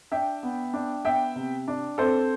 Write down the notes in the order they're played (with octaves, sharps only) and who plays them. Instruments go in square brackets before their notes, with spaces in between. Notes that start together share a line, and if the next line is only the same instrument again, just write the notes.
[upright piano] D4 E5 G5
B3
D4
B3 E5 G5
C3
D4
C4 A4 C5